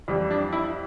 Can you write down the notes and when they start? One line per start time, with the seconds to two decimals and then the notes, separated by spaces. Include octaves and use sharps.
0.08 F2 E3 G3
0.31 D4
0.53 E4